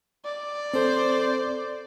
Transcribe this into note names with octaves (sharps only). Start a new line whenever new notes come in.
D5
C4 A4 C5